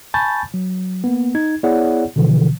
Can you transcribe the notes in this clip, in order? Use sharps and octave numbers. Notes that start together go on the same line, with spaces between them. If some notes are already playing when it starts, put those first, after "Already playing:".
G#5 A5 B5 C#6 G6 A6
F#3
A#3 B3
D#4 G#6
B3 E4 G#4 C#5 D5 F#5
B2 D3 E3 F3